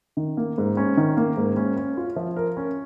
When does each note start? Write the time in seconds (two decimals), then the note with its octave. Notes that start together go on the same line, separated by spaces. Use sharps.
0.17 D#3
0.37 A#3
0.58 G#2
0.77 C#4
0.97 D#3
1.17 A#3
1.37 G#2
1.57 C#4
1.77 C#4
1.97 F4
2.16 F3
2.37 A#4
2.57 C#4